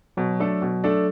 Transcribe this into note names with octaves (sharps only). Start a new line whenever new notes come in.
B2 F#3
A3 D4 A4
B2
A3 D4 A4